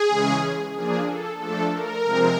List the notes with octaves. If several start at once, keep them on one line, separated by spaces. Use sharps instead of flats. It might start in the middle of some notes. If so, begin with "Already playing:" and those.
Already playing: G#4
C#3 E3 G#3 C#4
F3 A#3 D4 G#4
A4
F3 A3 D4 A4
A#4
C3 F3 G#3 C4